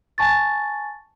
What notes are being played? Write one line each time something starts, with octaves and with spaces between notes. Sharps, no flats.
G#5 A5 C#6 A6